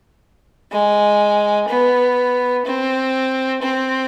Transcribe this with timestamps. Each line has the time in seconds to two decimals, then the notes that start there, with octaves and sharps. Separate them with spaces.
0.72 G#3
1.68 B3
2.65 C4
3.62 C4